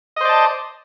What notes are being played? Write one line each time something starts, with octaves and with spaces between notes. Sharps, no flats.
C5 D5 D#5 A5